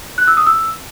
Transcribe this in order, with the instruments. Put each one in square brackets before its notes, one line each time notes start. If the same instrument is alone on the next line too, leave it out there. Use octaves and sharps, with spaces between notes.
[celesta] F#6
E6
D#6
E6